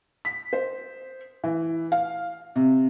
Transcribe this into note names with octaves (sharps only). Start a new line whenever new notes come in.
B6
C5
E3
F5
C3